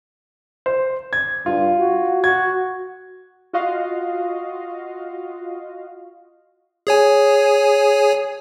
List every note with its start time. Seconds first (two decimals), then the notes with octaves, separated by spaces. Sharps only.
0.66 C5
1.13 G#6
1.46 G2 F4
1.79 F#4
2.24 F#4 G#6
3.53 F4 F#4 D#5 F5
6.87 G#4 C#5 G#5